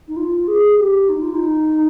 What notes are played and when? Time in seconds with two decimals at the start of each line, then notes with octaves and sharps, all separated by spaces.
0.08 D#4
0.16 F4
0.48 G#4
0.78 G4
1.09 D#4
1.22 F4
1.34 D#4